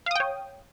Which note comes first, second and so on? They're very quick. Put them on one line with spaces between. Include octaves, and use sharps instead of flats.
F5 D#6 G5 C#5